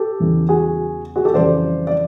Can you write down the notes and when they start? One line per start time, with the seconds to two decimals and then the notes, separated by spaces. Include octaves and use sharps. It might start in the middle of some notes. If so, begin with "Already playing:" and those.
Already playing: G4 A4
0.20 E2 C#3 E3 G3
0.49 F#4 G#4
1.16 F#4 G#4
1.25 G4 A4
1.34 F2 C#3 E3 G3 C5 D5
1.87 D5